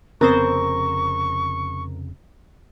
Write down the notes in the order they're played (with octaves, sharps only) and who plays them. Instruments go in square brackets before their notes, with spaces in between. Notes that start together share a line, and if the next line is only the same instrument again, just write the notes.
[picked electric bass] F1 F2 C#3 [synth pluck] B3 C4 C5 [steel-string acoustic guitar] A#4 [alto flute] C#6